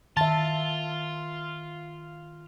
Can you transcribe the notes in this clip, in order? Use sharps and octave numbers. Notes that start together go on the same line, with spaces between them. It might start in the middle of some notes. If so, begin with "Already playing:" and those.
D#3 F4 E5 A5 A6